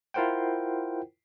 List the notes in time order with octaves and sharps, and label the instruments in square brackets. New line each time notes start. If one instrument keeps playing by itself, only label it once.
[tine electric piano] E4 F4 A#4 C5 F#5 G5